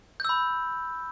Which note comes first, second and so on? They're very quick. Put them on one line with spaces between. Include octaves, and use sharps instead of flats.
G6 E6 B5